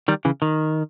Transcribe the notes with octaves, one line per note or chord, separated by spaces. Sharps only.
D#3 G3
C#3 E3
D#3